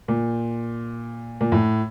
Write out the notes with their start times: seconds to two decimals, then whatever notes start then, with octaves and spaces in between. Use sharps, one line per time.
0.08 A#2
1.41 A#2
1.52 A2